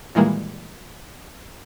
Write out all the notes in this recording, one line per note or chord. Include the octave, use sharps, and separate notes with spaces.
A#2 D#3 E3 G3 G#3 A#3